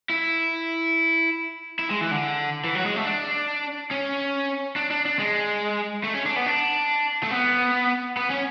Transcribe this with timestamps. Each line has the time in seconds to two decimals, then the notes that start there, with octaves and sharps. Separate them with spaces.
0.10 E4
1.79 E4
1.91 G#3
2.01 E3
2.11 D3
2.64 E3
2.75 F#3
2.86 G#3
2.96 A3
3.06 D4
3.91 C#4
4.76 D4
4.91 D4
5.06 D4
5.19 G#3
6.04 A3
6.14 C#4
6.26 D4
6.36 B3
6.46 D4
7.23 A3
7.31 B3
8.17 B3
8.30 C#4